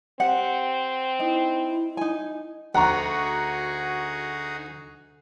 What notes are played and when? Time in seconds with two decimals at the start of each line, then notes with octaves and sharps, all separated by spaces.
0.20 C4 G4 F#5
1.20 D#4 E4
1.97 D#4 G#5
2.75 D2 D#4 F#4 G#4 F#5 A#5 C#6